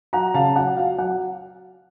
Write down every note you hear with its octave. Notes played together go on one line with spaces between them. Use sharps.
F#3 F#5 A#5
C#3 F5 A5
F#3 F#5
F#3 F5
F#3 F#5